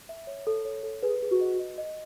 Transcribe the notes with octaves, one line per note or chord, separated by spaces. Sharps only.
E5
C#5
A4
C#5
A4
G#4 B4
G#4
F#4
D#5
D#5
D#5